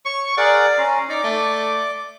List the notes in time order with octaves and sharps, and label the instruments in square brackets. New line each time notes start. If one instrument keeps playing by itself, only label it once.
[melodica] C#5 [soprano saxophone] C#6
[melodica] G#4 A#4 F#5 [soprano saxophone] D5
[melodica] C#4 A#5 C6
[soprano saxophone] D#4 [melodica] D5 D6
[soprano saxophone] A3